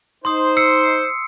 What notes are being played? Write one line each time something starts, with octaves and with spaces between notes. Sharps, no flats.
D#4 C5 C6 D#6
E6 C7 C#7